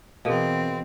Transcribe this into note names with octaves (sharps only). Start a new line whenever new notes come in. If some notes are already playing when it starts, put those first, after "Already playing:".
B2 E3 C4 G#4 A#4 F5